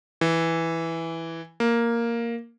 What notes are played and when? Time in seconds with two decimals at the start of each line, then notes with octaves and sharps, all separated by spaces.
0.21 E3
1.60 A#3